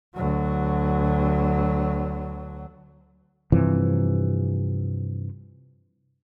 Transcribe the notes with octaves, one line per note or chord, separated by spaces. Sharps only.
D2 F#3
G2 C3 E3 F3